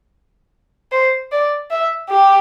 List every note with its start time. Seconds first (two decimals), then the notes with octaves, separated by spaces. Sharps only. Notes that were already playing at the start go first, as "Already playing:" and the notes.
0.92 C5
1.32 D5
1.71 E5
2.10 G4